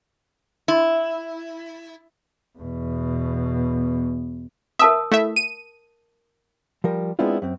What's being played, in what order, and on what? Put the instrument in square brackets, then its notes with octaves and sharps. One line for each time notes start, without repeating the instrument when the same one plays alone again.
[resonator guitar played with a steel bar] E4
[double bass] E2 B2
[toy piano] A#4 A5 D#6 [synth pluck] E5
[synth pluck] A3 E4 E5
D#7
[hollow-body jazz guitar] F3 G3 A#4
G#3 B3 C4 D4 E4 F4
F#2 C4